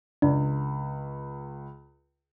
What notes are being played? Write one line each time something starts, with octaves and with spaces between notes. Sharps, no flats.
C#2 D4